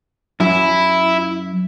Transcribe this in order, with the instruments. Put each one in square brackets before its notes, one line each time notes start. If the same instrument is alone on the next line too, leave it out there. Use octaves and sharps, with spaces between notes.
[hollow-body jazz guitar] F#2 [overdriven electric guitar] E4